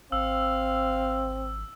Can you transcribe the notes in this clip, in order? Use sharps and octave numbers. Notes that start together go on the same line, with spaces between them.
G#1 C4 F5 E6